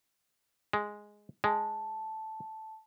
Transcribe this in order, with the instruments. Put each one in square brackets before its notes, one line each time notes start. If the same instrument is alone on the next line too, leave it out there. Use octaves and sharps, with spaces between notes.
[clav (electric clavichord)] G#3
[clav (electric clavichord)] G#3 [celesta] A5